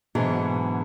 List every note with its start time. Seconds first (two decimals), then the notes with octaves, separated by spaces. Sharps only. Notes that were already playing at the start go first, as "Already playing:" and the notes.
0.15 G#2 B2 D3 E3 F#3 G#4